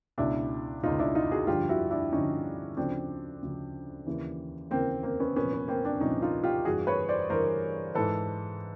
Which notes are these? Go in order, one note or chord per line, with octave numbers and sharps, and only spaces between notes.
C#2 B2 D4 E4
C#2 B2 D#4 F4
D4 E4
D#4 F4
F#4 G#4
G2 D3 F3 F4 G4
E4 F#4
D4 E4
G2 D3 F3 C#4 D#4
D2 C#3 F3 C4 D4
D2 C#3 F3
D#2 C#3 E3
D#2 C#3 E3 A#3 C4
A#3 C4
B3 C#4
C2 A#2 F3 B3 C#4
B3
A#3 C4
C4 D4
C2 A#2 F3 C#4 D#4
D#4 F4
F4 G4
G2 E3 F#4 G#4
B4 C#5
C5 D5
G2 E3 A#4 C5
G#2 E3 A4 B4